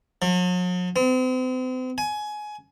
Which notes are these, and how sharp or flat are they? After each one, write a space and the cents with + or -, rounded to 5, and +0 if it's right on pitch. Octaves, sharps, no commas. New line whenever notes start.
F#3 -45
C4 -40
G#5 +20